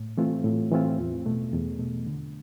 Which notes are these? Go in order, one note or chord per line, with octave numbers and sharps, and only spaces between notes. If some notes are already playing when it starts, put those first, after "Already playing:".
Already playing: A2
E3 A3 C4 F4
A2
E3 A3 C4 F4
E2
B2 A3
E2
B2 A3
D3